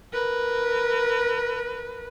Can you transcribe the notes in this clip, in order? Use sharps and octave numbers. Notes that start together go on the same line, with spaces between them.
A#4 B4